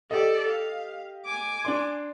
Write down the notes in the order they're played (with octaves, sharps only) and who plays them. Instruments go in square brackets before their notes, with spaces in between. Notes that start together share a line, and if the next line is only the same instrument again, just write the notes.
[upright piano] G4 D#5 [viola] A4 D5
[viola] F5
G#5 D6
[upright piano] D4 D5 C6